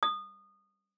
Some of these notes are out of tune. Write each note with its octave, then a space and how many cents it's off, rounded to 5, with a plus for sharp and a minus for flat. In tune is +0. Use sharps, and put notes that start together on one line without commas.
D#6 -20